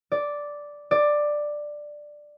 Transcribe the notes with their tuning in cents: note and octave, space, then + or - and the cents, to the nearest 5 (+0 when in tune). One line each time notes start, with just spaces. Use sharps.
D5 -5
D5 +10